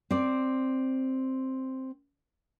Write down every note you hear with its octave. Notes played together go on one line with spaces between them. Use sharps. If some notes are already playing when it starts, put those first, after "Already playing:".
C4 D5